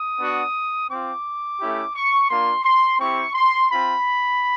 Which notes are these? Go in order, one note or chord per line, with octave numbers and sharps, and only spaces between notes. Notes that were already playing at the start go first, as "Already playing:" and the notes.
Already playing: D#6
B3 D4 F#4
C4 F4 D6
A3 C#4 E4 G4
C#6
A#3 D4 F4 C6
C6
C4 E4 G4 C#6
C6
C4 F4 B5